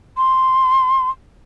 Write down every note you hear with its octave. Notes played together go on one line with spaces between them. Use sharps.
C6